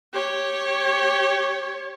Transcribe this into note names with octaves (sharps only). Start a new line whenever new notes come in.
G4 C#5